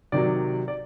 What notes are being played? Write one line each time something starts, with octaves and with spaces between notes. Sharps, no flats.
C3 D#3 F#3 D5
D5